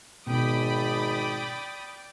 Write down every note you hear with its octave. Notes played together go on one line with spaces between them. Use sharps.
G#1 B2 D5 G5 B5 D6 D#6